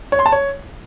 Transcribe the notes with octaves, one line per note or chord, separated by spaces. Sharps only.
C#5
C6
A5
C#5